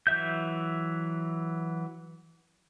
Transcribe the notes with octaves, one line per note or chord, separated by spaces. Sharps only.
E3 F#3 E5 G6